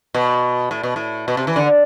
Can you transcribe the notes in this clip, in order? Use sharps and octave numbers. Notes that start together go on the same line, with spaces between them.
B2
A2
B2
A2
B2
C3
E3
D3